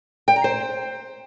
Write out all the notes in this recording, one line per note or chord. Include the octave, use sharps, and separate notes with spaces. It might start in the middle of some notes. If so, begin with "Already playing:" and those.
G5
A#5
C5